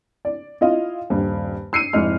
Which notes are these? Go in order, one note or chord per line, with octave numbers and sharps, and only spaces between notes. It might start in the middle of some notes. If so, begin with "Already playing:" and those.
D5
E4 F4 D#5 F5
D#1 G2
E6 C7 C#7 D#7
F1 G#2 E4 D#5 F6